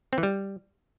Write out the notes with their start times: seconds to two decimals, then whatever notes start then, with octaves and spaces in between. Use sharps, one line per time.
0.13 C4
0.18 E3
0.23 G3